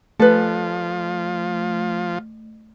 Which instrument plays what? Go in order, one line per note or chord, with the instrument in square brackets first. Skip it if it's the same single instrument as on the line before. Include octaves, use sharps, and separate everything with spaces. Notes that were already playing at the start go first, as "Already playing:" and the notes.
[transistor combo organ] F3 [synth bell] A3 [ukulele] A4 B4